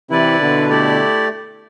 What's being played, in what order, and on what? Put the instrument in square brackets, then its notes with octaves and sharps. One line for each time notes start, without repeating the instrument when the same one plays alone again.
[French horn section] C3 E3 [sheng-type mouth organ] E4 B4 D5
[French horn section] B2 D3
[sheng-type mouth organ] A3 E4 G4 D5